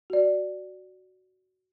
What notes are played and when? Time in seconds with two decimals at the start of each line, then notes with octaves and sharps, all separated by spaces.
0.10 F#4 D5